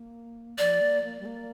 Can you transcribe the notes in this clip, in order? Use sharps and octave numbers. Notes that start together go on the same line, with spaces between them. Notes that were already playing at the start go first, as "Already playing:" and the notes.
Already playing: A#3
F3 D5
A#3
A#3
G3
A#3